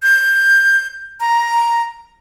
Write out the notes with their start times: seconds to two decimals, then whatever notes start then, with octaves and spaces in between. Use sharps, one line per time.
0.03 G6
1.20 A#5